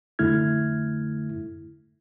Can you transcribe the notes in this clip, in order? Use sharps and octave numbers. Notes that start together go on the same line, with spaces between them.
F2 D3 A3 E4 F6 G#6